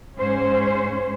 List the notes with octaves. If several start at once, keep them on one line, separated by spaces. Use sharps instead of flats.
G#2 C#4 C5